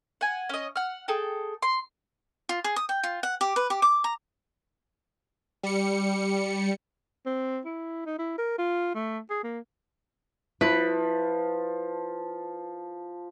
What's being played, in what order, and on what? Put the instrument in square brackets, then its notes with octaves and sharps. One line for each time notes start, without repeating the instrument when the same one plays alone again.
[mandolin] F#5 G#5
C#4 D#5
F#5 F6
G#4 A4 G5
C6
[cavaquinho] F4
G#4
D#6
G5
F4
F#5
G4
B4
G4
D6
A#5
[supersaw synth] G3 C#7
[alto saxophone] C4
E4
D#4
E4
A#4
F4
A3
G#4
A#3
[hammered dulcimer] F3 [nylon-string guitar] E4 [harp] B4